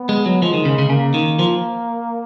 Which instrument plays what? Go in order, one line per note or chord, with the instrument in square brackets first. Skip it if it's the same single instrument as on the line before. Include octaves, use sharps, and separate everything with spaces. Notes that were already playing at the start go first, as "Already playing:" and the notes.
Already playing: [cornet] B3
[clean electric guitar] G#3
F#3
[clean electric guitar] F3 [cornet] G#3
[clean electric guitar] D#3
C#3
C#3
[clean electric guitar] C#3 [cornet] A#3
[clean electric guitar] D#3
F3